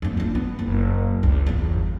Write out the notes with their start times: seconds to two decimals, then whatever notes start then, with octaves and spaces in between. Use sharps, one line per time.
0.02 F#1 F2
0.17 D4 F4
0.35 B3
0.59 F#1
1.23 C#2
1.47 G1 E2